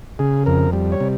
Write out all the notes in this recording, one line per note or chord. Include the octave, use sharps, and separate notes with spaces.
C#3 G#4
F2 A#4
G3
C#5
C3